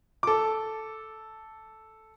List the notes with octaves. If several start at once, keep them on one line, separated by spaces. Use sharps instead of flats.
A4 D6